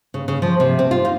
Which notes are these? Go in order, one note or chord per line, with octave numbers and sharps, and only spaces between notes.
C#3
C#3
F3
C3
C4
F4
D#4